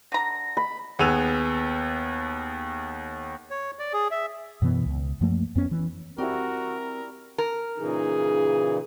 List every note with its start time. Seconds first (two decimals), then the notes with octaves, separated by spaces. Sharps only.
0.12 D3 A#5 A#6
0.57 B5
0.99 D#2 B3 G#4 E6 D#7 F7
3.50 C#5
3.79 D5
3.93 G#4
4.11 E5
4.62 F#2 B2 E3 B3
4.86 C#2
5.21 F#2 F3 A3 A#3
5.56 F2 B3 C#4
5.71 E3
6.18 G3 C4 E4 F#4 A#4
7.38 A#4
7.79 A#2 C#3 E3 D#4 G#4